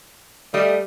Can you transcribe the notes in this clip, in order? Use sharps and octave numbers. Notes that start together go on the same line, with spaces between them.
G3 A3 D#5